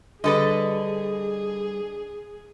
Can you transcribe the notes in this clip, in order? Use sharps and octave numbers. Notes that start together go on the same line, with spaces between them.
D3 G3 G#4 A4 B4 D#5